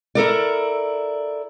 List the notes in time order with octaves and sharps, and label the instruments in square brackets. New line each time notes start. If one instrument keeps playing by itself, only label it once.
[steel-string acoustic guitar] E4 A4 A#4 D5